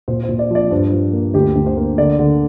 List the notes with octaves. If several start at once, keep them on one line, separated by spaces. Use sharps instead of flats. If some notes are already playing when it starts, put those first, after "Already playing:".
A#2 C5
C5
A#2
D5
F3 D5
G2 C5
F3
A#3
D2 G4
D2
C5
A#3
D3 D5
D3